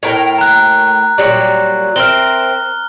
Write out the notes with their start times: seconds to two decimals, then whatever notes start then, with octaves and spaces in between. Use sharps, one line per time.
0.03 A2 A#4 G5
0.38 A#5 F#6
1.18 A#2 F#3 G3
1.96 C4 A#4 E5 F6 G7